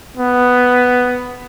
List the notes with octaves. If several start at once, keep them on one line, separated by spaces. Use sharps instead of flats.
B3